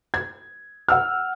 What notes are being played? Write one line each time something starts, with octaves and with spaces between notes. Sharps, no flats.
G#6
F#5 E6 F6